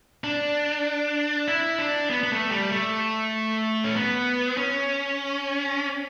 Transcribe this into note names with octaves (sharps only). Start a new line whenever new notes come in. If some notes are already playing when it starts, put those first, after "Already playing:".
D4
E4
D4
B3
B3
A3
G3
A3
C#4
B3
C#4